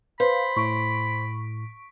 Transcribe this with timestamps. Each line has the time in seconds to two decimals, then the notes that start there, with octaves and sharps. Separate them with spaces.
0.20 B4 C5 F5 B5
0.57 A2 C#6 B6 D7